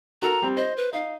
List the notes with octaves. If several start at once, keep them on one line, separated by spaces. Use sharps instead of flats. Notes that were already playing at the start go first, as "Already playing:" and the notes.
F#4 A4 A#4 A#5
G3 C4
C5 D#5
B4
D#4 F5